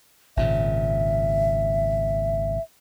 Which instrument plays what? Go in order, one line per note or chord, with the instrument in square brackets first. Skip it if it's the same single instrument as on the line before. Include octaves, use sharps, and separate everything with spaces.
[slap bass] G#1 A#2 C#3 [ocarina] E5